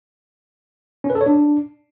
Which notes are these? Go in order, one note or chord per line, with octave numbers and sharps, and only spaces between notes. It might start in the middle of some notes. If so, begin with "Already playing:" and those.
C#4
B4
A4
C#5
D4